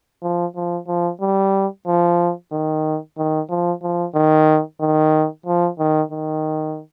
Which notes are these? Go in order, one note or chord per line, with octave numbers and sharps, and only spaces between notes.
F3
F3
F3
G3
F3
D#3
D#3
F3
F3
D#3
D#3
F3
D#3
D#3